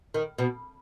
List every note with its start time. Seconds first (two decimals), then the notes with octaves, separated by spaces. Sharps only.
0.14 D#3
0.38 B2